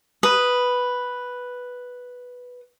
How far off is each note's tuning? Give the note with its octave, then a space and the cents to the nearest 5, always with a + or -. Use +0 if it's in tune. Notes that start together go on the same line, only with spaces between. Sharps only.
B4 +0 D#6 +0